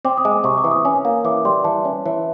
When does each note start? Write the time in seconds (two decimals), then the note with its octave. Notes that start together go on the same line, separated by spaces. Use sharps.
0.05 C4 D6
0.18 D#6
0.25 G#3
0.31 D6
0.44 C3 C#6
0.58 D6
0.64 E3
0.71 D#6
0.85 C#4
1.05 A#3
1.25 E3 D6
1.45 G3 C6
1.64 E3 A5
1.85 C#4
2.06 E3